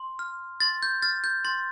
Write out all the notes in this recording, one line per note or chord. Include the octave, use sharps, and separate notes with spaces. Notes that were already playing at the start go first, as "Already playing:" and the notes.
Already playing: C6
F6
C6 A6
G6
F6 A6
G6
C6 A6